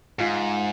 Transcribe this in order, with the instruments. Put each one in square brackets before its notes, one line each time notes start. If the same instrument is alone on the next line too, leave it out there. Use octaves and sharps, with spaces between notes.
[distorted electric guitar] G#2 [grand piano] F4